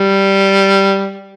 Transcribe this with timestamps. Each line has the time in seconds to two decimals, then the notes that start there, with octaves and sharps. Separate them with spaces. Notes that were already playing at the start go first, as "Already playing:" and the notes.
Already playing: G3